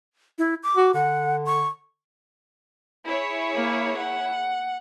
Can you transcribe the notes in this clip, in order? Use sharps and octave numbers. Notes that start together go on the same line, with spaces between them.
E4
D6
F#4
D3 F#5
C#6
E4 G#4 C#5
A#3
F#5